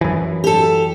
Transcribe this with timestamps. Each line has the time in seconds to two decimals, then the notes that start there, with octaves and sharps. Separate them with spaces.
0.01 F#2 E3
0.44 G4 A4